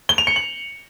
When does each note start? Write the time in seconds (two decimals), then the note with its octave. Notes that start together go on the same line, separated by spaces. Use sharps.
0.09 G7
0.18 F7
0.27 C#7
0.36 F#7